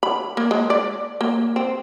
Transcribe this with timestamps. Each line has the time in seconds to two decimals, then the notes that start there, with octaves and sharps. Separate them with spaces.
0.03 B5
0.37 A#3
0.51 G#3
0.70 D5
1.21 A#3
1.56 C4